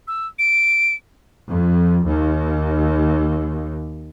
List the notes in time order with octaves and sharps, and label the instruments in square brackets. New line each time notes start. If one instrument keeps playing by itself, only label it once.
[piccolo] E6
D7
[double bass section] F2
D#2